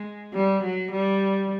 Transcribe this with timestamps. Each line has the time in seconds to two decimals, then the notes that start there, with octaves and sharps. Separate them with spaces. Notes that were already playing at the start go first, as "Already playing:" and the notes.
Already playing: G#3
0.34 G3
0.63 F#3
0.92 G3